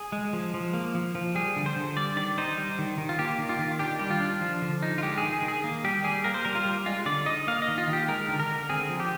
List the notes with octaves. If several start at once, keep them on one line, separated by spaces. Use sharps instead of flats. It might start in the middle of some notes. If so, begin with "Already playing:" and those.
Already playing: G#4
G#3
F3
F3
A#3
F3
F3
G3 G#4
D3
C5
D3
G3 D5
D#3 D5
D#4 C5
G3
D#3
D#3
F4
A#3 G4
D#3
F4
D#3
D4 G4
G3 G4
F4
D4
F3
D3
D#4
F4
G#3 G4
G#4
D#3
G#4
D#3
G#4
A#3
G3 G4
G3 G#4
A#3 A#4
C5
G3 A#4
F4
G3
G#3 F4
D3 D5
D#4 D#5
A#3 F5
D#5
D#3
F4
D#3
G4
G#3 A#4
D3
A#4
D3
C4 G#4
F3
G4